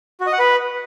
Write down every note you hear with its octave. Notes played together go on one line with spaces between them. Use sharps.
F#4
D#5
F#5
B4